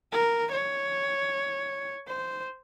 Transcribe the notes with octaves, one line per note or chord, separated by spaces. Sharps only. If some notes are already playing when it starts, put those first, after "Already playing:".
A#4
C#5
C5